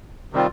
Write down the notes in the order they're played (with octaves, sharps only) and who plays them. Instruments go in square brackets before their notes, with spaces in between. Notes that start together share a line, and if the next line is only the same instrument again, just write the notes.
[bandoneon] C3 D#3 G3 C4 F4